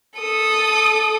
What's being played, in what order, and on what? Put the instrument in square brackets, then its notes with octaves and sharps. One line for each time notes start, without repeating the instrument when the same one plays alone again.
[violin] A4 D#6